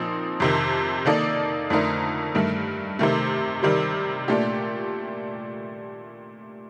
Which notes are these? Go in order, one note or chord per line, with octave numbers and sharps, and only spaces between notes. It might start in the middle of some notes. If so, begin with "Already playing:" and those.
Already playing: A#2 F3 C4 D#4
F2 C3 D#3
D#3 A#3 D#4 A4 D5
F2 D3 A3 D#4 A#4
G2 D#3 A3
C3 D#3 A3
C3 D#3 G3
A#2 A3 D4 G4